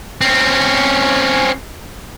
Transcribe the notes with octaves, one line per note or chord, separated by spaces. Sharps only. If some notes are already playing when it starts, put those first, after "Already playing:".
C4 C#4